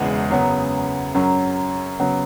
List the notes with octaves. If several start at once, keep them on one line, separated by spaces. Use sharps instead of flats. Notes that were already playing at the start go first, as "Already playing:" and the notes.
Already playing: E1 E2 C#3 G#3 B3 E4 G#4
F#2 C#3 F#3 B3
F#2 F#3 C#4
C#3 F#3 B3